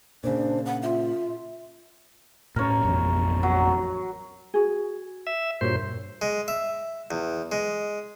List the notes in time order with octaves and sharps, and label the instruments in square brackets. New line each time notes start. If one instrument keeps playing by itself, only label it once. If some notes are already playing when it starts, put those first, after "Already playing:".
[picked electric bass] A#2 C#3 [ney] D4 [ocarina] C5
[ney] F#5
[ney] F4 [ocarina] E5
[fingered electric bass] A2 C#4 [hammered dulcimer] A#4 C#5
[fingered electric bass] A1 F2 B2
[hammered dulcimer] F#3
[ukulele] F#4 G#4
[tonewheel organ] E5
[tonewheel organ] G2 A#2 C5 [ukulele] F#4 A#4 C#5
[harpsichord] G#3
E5
E2
G#3